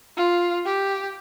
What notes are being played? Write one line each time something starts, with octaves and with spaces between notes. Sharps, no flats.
F4
G4